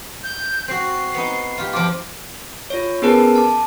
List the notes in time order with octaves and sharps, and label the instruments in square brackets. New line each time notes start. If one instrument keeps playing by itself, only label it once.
[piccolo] G6
[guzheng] C4 F#4 [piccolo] C7
[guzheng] B3 D#4
F4 G4
[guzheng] F3 F4 [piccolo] D6
[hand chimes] F4 C#5
B3 C#4 G#4 A#4 B4 A5
A5 D6